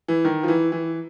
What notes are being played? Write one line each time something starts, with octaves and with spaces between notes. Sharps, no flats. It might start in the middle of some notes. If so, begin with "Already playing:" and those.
E3
D#3
F3
E3
E3